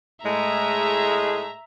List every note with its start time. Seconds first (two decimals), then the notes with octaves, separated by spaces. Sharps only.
0.25 A2 G#3 E5 A#5